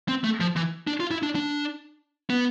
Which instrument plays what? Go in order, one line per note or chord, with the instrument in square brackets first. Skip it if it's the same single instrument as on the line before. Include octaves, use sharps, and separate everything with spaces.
[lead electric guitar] C4
A3
F3
E3
D4
F4
E4
D4
D4
B3